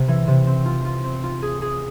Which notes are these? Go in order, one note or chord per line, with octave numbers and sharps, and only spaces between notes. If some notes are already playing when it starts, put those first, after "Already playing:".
Already playing: C3
E3
C3
C4
F4
F4
C4
F4
G#4
G#4